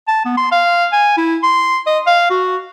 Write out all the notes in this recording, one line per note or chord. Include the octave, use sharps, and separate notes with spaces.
A5
B3
C6
F5
G#5
E4
C6
D#5
F5
F#4